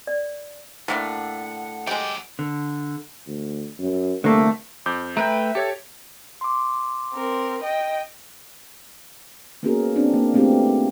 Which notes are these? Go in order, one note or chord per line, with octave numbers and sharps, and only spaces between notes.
D5
A2 D3 A#3 D4 F#5
F#3 G#3 G4 D5
D3
D2
F#2
C2 D3 A3 A#3
F2 D6 G6
A3 B4 E5 G5 A#5
G4 A4 C#5 G#6
C6 D6
C4 A#4
D#5 G5
A#3 B3 C#4 F#4 G#4 A#4
C4 D4
A#3
A3 B3 C4 D4 F4 G4